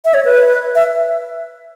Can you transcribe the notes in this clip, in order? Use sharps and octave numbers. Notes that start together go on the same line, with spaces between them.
E5
C#5
B4
E5